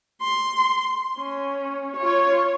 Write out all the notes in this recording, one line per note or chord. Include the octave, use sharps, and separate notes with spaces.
C6
C#4
F4 C#5